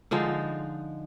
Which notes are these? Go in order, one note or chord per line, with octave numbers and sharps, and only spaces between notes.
D3 F3 G#3 D#4